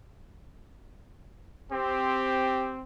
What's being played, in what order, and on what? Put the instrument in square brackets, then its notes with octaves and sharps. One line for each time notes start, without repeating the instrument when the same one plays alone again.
[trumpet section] C4 [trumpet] G4